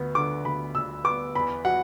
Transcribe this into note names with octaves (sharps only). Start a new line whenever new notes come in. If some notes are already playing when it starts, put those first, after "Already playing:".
Already playing: D2 B3
D3 D6
D2 B5
D2 E6
B3 D6
E2 B5
F#3 F#5